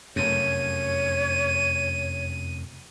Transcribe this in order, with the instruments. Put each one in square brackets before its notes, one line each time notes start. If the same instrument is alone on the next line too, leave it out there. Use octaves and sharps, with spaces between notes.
[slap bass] F1 F#2 [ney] C#5 [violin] D#7